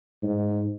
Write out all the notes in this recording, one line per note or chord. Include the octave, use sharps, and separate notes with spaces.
G#2